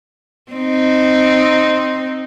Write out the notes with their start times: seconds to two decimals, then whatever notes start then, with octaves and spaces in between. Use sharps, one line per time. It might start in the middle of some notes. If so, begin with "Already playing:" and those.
0.52 C4 D#4